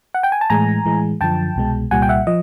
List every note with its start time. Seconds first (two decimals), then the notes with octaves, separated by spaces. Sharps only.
0.15 F#5
0.23 G5
0.32 G#5
0.41 A5
0.50 A2 E3 G#3 G#5 A#5
0.85 A2 E3 G#3
1.21 F#2 D3 F3 G5 A5
1.56 C2 B2 G#3
1.91 C2 A#2 G3 F#5 G#5
2.02 G5
2.09 E5 F#5
2.27 F3 D#5